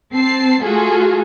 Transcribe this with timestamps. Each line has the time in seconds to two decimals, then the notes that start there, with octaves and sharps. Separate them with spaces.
0.14 C4 A5 C7
0.63 A3 F4 F#4 G#4 A4